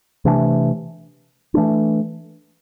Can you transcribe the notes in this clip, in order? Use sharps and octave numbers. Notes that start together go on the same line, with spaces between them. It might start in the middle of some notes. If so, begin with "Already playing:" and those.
C3 E3 A3 D4
E3 A3 D4